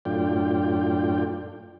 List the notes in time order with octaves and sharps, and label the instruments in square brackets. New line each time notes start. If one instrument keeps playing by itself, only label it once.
[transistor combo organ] F#2 A2 D4 F4 G5